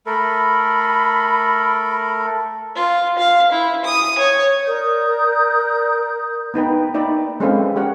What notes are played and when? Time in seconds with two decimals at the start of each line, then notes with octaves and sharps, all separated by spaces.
0.06 A3 A4 A#4 B5
2.76 F4
3.19 F5
3.51 E4
3.85 D#6
4.18 C#5
4.66 A#4 D5 D#6 G6
6.54 B3 D#4 B4 G5
6.94 A#3 D#4 D5 E5 G5 B5
7.40 G#3 C4 C#4 A4 B4 F5
7.76 C#4 G4 A#4 C#5 F#5